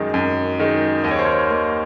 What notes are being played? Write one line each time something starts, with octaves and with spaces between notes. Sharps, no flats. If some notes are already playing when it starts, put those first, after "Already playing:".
Already playing: F#2 D#3 G#3 D#4
F#2
D#3 G#3 D#4
D#2 D#5
C#5
C5
A#4 C#5
D#3 A#3